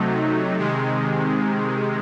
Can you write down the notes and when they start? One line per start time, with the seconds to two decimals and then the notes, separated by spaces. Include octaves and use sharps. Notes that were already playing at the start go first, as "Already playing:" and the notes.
Already playing: C3 F#3 A3 D#4
0.57 C3 D#3 G#3